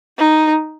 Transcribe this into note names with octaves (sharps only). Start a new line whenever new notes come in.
D#4